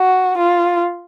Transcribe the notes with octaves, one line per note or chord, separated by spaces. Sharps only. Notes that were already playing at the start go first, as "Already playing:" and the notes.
Already playing: F#4
F4